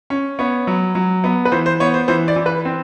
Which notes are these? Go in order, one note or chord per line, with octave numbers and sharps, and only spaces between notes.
C#4
B3 C#5
F#3
F#3
B3
B4
E3 C5
C5
B3 C#5
C5
E3 C5
D5
E3
B4
C4